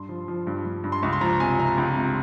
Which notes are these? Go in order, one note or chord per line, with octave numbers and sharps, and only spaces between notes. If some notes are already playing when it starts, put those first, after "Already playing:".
Already playing: G2 C6
F3
F3
G2
G2
G2
C6
C#2 C#6
C6
F3 A#5
C3 G#5
C3 A#5
C#2
C3